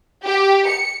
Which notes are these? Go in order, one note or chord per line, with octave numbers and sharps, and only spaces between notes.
G4
C#7